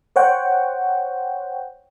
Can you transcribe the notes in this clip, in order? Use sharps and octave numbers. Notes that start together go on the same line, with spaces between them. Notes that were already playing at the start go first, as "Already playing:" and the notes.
C5 C#5 F#5 G5